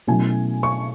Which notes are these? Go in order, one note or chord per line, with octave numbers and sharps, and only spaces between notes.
B2 F#3 A3 C#4 E4 G#5
C#6